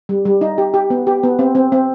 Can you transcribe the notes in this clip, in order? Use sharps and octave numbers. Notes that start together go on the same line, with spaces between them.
G3
G3
D#4
G4
G4
B3
G4
B3
C4
C4
C4